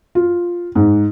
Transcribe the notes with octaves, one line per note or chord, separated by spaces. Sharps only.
F4
G#2